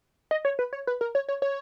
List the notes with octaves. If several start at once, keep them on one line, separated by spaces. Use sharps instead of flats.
D#5
C#5
B4
C#5
B4
A#4
C#5
C#5
C#5